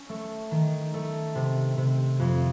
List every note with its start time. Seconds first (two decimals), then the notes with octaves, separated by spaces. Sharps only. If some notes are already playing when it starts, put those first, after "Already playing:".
Already playing: C#4
0.09 A3
0.51 D#3
0.94 A3
1.35 C3
1.77 C3
2.19 F2